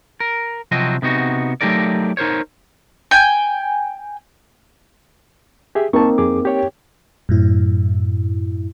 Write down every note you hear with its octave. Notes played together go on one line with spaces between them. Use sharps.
A#4
C3 F3 F#3 C4 F#4 D#5
C3 B3 D#4 F#4
F#3 A3 D#4 G4 A#4 D5
D#4 A#4 C5 C#5
G5 G#5
G4 G#4 E5
A#3 C4 D#4 A5 C#6
F2 G#4 D6
G4 C#5 G5
F#2 A2 E4